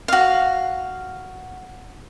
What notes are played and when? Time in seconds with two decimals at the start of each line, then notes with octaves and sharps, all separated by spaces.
0.08 F#4 F5